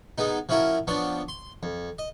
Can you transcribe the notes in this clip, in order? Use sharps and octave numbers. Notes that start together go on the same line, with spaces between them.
G#3 B3 D#4
F3 C#4 E4 F#4 A#4
F3 B3 D4 C#5
C6
F2
D#5